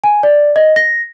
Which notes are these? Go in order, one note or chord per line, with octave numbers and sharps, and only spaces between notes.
G#5
D5
D#5
A#6